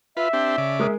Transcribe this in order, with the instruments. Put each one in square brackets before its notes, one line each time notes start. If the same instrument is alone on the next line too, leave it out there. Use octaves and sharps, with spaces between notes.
[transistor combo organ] F4 B4 [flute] E5
[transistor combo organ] C4 D4 G4
C#3 D5
[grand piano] G#3 A#4 D#6